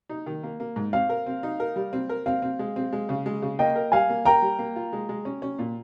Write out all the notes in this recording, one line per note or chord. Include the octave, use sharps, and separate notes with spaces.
D#4
D#3
A#3
A#3
G#2
C4 F5
A#4
C4
D#4
A#4
G3
C4
A#4
C4 F5
C4
G#3
C4
G#3
C#3
G#3
C#3
A#3 D#5 G5
A#4
G3 F5 G#5
A#3
A#4 G5 A#5
G3
A#3
F4
G#3
G#3
C#4
C#4
A#2